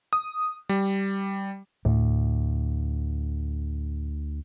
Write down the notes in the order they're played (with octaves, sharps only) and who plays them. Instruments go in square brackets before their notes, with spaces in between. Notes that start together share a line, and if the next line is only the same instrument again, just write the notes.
[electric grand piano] D#6
G3
[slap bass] D2 [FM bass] A2